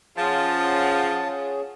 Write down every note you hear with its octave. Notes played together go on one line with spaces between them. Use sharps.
F3 C#4 F4 G#4 F#5 A5